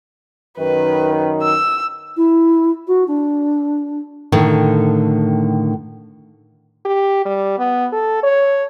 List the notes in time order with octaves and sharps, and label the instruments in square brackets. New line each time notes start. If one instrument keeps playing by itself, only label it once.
[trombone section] F#2 D#3 [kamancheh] B4
[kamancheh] E6
[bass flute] E4
F#4
D4
[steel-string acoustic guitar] A2 D3 D#3
[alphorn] G4
G3
B3
A4
C#5